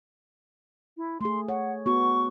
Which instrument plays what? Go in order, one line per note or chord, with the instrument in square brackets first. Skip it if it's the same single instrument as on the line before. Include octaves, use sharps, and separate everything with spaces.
[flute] E4
[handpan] A3 G#4 [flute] C6
[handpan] C#5 [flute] F#5
[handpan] B3 F#4 [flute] C#6